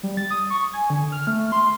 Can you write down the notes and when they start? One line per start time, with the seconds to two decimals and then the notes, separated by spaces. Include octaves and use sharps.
0.03 G3
0.17 A6
0.31 D#6
0.50 C#6
0.73 G#5
0.90 D3
1.12 F6
1.27 A3
1.52 C6